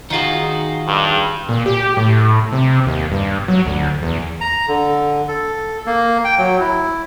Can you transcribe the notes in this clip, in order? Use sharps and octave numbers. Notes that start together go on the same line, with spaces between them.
D#3 D#4 F4 F#4 G#4
G2
A#2
G4
A2
C3
D#2
G2
F#3
D2
E2
A#5
D3
A4
A#3
G5
F#3
E4